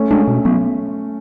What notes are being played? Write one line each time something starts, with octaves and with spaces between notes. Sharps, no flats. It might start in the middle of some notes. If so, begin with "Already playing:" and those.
Already playing: A3 C#4
G#3 D4
B2
F#3 B3